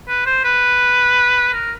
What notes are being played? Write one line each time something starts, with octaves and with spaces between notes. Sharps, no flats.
B4
C5
B4
A#4